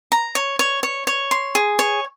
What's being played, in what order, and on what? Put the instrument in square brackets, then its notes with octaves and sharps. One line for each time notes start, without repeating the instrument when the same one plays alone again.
[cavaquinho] A#5
C#5
C#5
C#5
C#5
C6
G#4
C#5